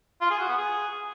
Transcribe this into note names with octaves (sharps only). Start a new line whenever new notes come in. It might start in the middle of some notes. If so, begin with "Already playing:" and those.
F4
G#4
F#4
B3
G#4